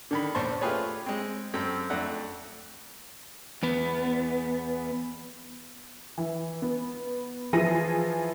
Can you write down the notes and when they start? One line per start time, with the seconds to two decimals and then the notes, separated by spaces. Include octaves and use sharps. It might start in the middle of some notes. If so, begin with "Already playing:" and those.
0.11 D3 D#3 B5
0.35 A#1 E2 C5 A5 C6 C#6
0.61 A3 F4 G4 G#4 B4 C#5
1.06 G#3 C4
1.54 F#2 C4 A4 G5
1.90 F2 A3 D4 F#5
3.63 E2 B3
6.18 E3
6.62 B3
7.53 E3 F3 G#4 A#6 D#7